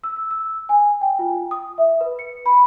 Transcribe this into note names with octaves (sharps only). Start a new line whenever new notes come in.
E6
E6
E6
G#5
G5
F4
D#6
E5
B4
C#7
B5